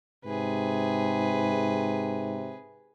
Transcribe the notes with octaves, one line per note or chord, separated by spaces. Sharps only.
G#2 C3 G#4 B4